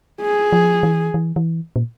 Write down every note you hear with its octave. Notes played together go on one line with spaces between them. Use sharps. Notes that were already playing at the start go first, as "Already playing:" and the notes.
G#4
F3
E3
E3
E3
A#2